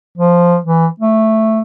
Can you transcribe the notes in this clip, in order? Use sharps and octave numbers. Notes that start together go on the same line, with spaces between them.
F3
E3
A3